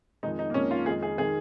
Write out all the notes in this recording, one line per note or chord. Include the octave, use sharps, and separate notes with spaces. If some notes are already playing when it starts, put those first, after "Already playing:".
F2 D#3 G#3 D#4
D#4
A#3
F2 D#3 G#3 C#4
F4
F2 D#3 G#3 G#4
G#4
D#3 G#3 G#4